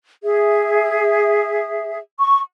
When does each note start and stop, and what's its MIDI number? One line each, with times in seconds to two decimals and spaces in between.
0.24 1.98 68
0.24 1.98 76
2.19 2.40 85